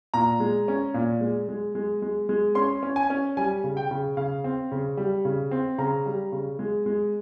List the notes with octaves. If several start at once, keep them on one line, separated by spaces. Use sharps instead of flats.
A#2 A#5
G#3
C#4
A#2
G#3
G#3
G#3
G#3
G#3
C#4 C6
C#4
G#5
C#4
G3 G#5
C#3
G5
C#3
C#3 F5
C4
C#3
G3
C#3
C4
C#3 A#5
G3
C#3
G#3
G#3